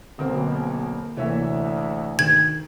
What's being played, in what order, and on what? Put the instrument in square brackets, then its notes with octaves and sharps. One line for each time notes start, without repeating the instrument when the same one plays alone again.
[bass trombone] B1 [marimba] D3 C5 [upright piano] A#3 C4
[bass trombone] D2 [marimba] C3 A#3 [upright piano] E3 C#5 E5
[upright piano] D#3 [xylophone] G#6